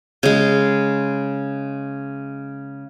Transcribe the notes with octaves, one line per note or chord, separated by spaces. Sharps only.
C#3 G#3